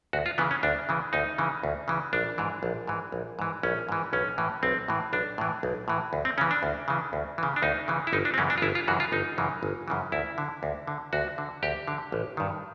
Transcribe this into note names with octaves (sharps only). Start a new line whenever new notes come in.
D2 F#4
F4
C#3 E3 B3
C#4
D2 D4
C#3 E3
D2 D#4
C#3 E3
D2
C#3 E3
A#1 D4
G#2 E3
A#1
G#2 E3
A#1
G#2 E3
A#1 C#4
G#2 E3
B1 C#4
A2 E3
B1 C4
A2 E3
B1 D4
A2 E3
B1
A2 E3
D2
C4
C#3 E3 C#4
D4
D2
C#3 E3
D2
C#3 E3
D4
D2 D#4
C#3 E3
E4
G1 D#4
D4
C4
F#2 C#3 E3 C#4
D4
F4
G1 E4
F4
F#2 C#3 E3 F#4
F4
G1 D#4
F#2 C#3 E3
G1
F#2 C#3 E3
D2 E4
D3
D2
D3
D2 F#4
D3
D2 G4
D3
A1
G2 D#3